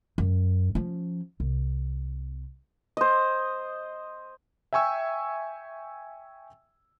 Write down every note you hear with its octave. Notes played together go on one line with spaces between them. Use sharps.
F#2
F3 C#4
C2
C5 D#5
E5 G5 G#5 C#6 E6